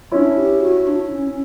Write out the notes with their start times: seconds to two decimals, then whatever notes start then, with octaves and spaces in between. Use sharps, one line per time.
0.12 C#4 D4 E4
0.37 G4
0.62 F#4
0.87 D4
1.05 D4
1.12 C#4
1.29 C#4